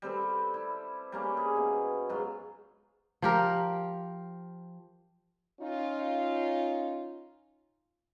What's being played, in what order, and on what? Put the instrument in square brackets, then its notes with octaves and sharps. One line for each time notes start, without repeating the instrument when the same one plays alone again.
[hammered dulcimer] G3 C4 A4 B4
E4
G3 A#3 C#4
G#4
B2
G#2 F#3 F4
[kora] F3 G4 A#4
[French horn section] C#4 D#4 F4